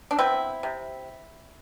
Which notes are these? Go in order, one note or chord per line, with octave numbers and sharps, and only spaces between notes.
D4
B3 C4 E4
C3